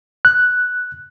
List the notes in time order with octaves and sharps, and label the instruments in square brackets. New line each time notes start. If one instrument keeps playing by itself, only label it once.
[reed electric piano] F#6